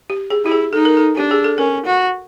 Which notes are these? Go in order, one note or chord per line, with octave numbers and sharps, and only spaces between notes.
G4
G#4
E4 G4
G#4
D#4 A4
A#4
A4
D4 G4
G#4
A4
C#4 A#4
F#4